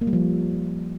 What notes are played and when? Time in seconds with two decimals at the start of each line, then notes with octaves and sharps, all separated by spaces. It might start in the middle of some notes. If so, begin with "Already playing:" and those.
0.01 A#3
0.07 G3
0.13 F3